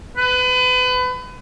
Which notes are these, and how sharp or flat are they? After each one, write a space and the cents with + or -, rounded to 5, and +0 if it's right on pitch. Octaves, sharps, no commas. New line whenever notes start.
B4 +30